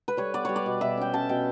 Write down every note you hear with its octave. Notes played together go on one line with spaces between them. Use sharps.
B4
G3 C#5
B3 D5
G3 C#5
D5
B2
B2 E5
C#4 G5
C#4 A5
B2 G5